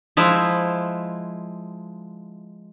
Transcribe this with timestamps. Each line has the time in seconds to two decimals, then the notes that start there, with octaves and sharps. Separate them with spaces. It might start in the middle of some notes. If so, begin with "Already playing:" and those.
0.17 F3 G#3 E4